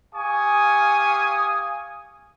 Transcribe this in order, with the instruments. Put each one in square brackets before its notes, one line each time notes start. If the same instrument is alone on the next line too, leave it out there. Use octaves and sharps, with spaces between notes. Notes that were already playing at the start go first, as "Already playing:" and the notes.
[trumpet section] G4 F5 G#5 C#6 D#6